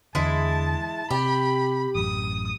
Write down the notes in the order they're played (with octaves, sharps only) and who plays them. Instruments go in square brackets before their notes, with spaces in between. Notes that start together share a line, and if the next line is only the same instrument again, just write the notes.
[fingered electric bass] E2 D3 [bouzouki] G#3 E4 [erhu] A5
[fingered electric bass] C3 [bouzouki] G4 [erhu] B5
[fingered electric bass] A1 F#2 [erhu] D#6